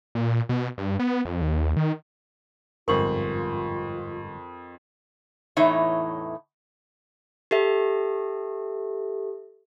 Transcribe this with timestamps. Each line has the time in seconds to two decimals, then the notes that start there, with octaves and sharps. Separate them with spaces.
0.15 A#2
0.49 B2
0.78 G2
0.99 B3
1.25 F2
1.41 D#2
1.76 D#3
2.88 G1 F2 G#2 F4 A#4 C5 C#6 F#7
5.57 E2 A2 E3 D#4 C#5 E5
7.51 G4 A4 E5